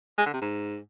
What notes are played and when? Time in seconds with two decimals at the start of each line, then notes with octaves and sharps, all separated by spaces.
0.18 G#3
0.26 D3
0.34 C3
0.41 G#2